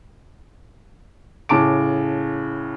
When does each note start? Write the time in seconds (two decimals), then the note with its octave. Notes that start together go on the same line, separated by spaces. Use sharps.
1.49 A2 C#3 A5 D6 D7